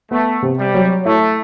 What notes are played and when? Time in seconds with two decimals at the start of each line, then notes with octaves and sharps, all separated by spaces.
0.11 A3 B3
0.42 C3
0.59 G3
0.74 F#3
1.05 A3 E4